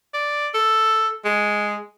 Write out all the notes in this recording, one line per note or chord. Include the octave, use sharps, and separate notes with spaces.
D5
A4
G#3